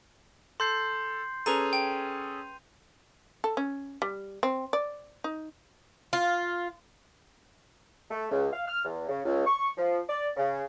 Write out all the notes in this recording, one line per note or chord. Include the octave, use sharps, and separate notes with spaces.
A4 C6 G6 C7
C#4 G#4 A4 B4 A#5 D#7 F7
G5
A4
C#4
G3
C4
D5
D#4
F4
A3
C#2
F5
F6
E2
C#3
C#2
C#6
F3
D5
C#3